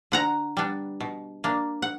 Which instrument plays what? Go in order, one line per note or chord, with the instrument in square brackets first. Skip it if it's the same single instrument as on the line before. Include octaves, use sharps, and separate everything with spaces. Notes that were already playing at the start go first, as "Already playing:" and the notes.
[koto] D3 F#5 A#5
G3 B3 D4
B2
A#3 D4
F#5